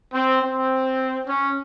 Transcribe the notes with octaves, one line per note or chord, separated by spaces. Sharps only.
C4
C4
C#4